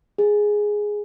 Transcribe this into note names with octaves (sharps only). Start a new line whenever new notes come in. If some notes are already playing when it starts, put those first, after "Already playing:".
G#4